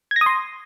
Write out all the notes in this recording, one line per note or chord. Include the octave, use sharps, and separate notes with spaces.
G#6
A#6
D#6
C6